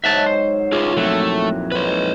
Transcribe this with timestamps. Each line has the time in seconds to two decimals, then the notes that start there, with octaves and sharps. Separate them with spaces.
0.04 G#2 F#3 D#5 E5 F#5 A5
0.26 C5
0.72 E4 F4 G#4 C#5 C6
0.97 F2 A#2 F#3 A3
1.72 G#2 B4 C#5